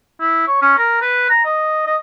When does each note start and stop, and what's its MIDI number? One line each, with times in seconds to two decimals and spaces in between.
0.21 0.46 64
0.48 0.57 73
0.62 0.74 61
0.78 1.00 70
1.01 1.26 71
1.30 1.44 82
1.45 1.82 75
1.86 1.96 75